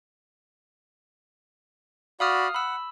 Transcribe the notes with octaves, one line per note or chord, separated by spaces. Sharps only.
F#4 D5 F5 B5 D#6 F6
F#5 B5 E6